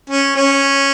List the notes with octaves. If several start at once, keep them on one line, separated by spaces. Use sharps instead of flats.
C#4
C#4